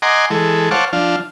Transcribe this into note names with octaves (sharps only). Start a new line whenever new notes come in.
D#5 F#5 G#5 A#5 C6 D6
E3 G#3 A4
C5 C#5 F5 F#5 A5 D6
F3 D4 F5